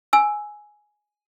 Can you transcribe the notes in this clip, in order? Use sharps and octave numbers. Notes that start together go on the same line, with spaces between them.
G#5 E6